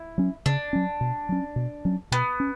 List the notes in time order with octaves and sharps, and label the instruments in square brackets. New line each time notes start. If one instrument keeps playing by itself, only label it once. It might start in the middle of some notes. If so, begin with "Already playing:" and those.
Already playing: [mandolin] E4
[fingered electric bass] F#3 C#4
[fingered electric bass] C#3 [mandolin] D4
[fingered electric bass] F#3 C#4
B2
F#3 C#4
B2
F#3 C#4
[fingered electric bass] B2 [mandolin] B3
[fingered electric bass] C#4